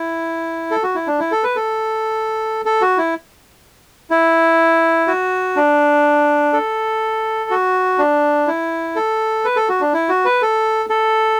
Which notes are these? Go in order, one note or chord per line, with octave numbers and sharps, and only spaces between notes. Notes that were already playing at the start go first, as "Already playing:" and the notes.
Already playing: E4
A4
F#4
E4
D4
E4
A4
B4
A4
A4
F#4
E4
E4
F#4
D4
A4
F#4
D4
E4
A4
B4
A4
F#4
D4
E4
F#4
B4
A4
A4